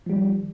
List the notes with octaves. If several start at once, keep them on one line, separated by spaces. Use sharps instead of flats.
D#3 F3 G3